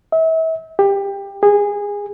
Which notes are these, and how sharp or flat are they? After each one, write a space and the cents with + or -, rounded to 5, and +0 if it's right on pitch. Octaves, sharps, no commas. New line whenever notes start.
E5 -35
G4 +20
G#4 -20